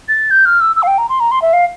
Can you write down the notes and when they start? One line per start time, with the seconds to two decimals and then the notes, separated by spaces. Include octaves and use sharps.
0.08 A6
0.31 G6
0.46 F6
0.61 E6
0.76 E6
0.83 F5
0.87 G5
0.98 A#5
1.09 C6
1.20 A#5
1.31 C6
1.42 E5
1.53 F5